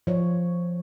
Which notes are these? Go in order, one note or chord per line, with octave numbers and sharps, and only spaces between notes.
F3 C#5